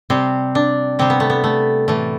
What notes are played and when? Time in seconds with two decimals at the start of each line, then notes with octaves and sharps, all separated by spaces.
0.10 C3 G3 C4
0.55 D4
0.99 C3 G3 C4
1.10 B3
1.20 A3
1.30 B3
1.44 A3
1.88 A2 E3 A3